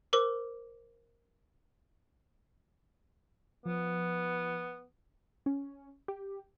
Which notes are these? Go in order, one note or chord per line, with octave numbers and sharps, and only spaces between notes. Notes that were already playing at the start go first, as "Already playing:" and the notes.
A#4 C5 D6
F3 B3
C#4
G4